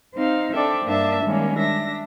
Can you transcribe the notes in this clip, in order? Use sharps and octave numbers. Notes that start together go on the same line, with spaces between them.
C4 D#4 F5
D4 A4 C5 D5 E5 G5
G2 A#3 D4 D5 E5 A5
D#3 G3 G#3 A#3 C#4
D4 E5 A#6